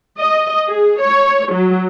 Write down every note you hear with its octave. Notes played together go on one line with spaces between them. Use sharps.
D#5
G#4
C#5
F#3